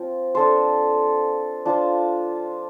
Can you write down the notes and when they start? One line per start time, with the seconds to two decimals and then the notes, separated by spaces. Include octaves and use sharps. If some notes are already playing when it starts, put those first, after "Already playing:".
Already playing: F3 C4 F4
0.35 D4 A4 C5
1.66 D4 F4 C5